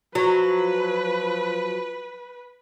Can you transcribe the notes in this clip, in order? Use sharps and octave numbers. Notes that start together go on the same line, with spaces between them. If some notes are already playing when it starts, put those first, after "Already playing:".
F3 F#3 B4